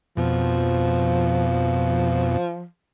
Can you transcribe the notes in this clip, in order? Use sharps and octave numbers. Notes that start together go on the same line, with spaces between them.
F2 B2 F3